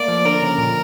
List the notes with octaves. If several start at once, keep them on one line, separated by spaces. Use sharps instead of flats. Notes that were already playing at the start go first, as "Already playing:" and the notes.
Already playing: A3 A#3 D5
F3
D3 A#4
C#3
A#2